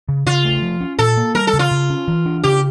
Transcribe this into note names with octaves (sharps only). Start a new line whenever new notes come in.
C#3
C#3 F4
A3
F3
C#4
A#2 A4
A#3
G3 A#4
A4
C#3
F4
C#3
C#4
E3
D4
C#3 G4